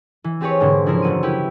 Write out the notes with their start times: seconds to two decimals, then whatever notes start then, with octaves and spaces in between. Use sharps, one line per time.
0.24 E3
0.41 C4 G4 G#4 B4 C#5
0.60 G#2 B2 D3 A#3 C5
0.86 C#3 F3 C#4 E4 A#4 C5
1.02 F#1 F#3 D#7
1.23 E4 G4 B4